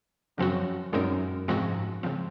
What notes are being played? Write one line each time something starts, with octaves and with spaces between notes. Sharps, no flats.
F#2 C#3 F3 C4 F#4
F#2 A#2 G#3 C4 D#4 A#4
G#2 C3 F3 G#3 C4 F#4
C#3 F3 C4